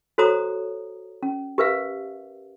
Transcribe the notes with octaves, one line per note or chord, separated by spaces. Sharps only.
F#4 A4 C5 C#5 A#5 D#6
C#4
G4 A#4 B4 E5 F5